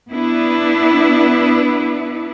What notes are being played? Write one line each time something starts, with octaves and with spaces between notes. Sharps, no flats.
B3 D4 E4 B4